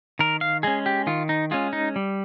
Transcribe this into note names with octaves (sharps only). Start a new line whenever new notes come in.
D#3 A#4
F5
G#3 C#4 G#4
G4
D#3 F4
D#4
G#3 C#4 F4
D#4
G3